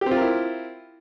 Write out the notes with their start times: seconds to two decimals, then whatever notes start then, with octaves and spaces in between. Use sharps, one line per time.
0.01 G4
0.06 C4
0.11 F4
0.16 A#4
0.21 E4